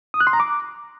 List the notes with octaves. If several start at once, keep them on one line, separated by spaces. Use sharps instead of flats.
D#6
F#6
C6
A#5
D6